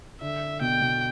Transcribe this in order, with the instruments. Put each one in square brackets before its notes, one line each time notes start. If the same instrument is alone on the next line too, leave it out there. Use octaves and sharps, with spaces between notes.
[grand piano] D3 [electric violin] E5
[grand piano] B2 [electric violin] G5
[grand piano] B2